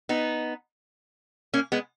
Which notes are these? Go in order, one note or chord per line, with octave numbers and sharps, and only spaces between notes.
B3 D#4
A#3 C#4
G#3 B3